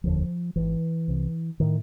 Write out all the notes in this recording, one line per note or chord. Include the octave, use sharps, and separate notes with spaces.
F1 D#2 D3 F3
G#1 G#2 E3
C2 C3
A2 D#3